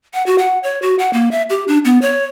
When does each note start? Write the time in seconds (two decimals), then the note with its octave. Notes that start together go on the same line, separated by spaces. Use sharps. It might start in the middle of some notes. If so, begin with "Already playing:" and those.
0.14 F#5
0.26 F#4
0.38 F#5
0.63 C#5
0.82 F#4
0.99 F#5
1.13 A#3
1.31 E5
1.50 G4
1.68 D4
1.85 B3
2.02 C#5